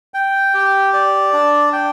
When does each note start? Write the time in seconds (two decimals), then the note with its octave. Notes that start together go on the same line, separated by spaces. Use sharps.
0.14 G5
0.54 G4
0.93 D5
1.33 D4
1.73 G5